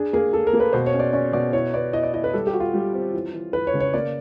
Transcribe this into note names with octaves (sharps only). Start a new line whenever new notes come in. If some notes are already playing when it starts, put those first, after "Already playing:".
Already playing: D4 G#4
A#3 G#4
A#3 A4
A#4
A#3
B4
B2 C5
C#5
C#4
D5
C#4 D5
B2 D5
E4 C#5
B3 D5
E4 D#5
D5
E4 D#5
B4
G3 A4
G4
F#4
F4
G3
C4
E3
E3
E3 B4
C#5
C#3
C#5
A#3 D5